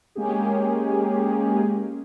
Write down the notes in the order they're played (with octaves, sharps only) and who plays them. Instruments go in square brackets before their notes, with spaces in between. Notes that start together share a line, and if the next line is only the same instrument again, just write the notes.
[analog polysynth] G#3 A#3 C#4 G4 G#4